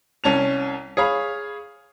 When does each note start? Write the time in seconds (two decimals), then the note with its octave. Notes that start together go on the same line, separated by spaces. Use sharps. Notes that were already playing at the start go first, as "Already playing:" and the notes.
0.24 C2 C#4 A5 F7
0.97 G#4 C#5 F5 B5